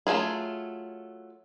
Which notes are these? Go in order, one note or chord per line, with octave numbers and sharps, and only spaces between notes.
F#3 A3 D4 F4 G#4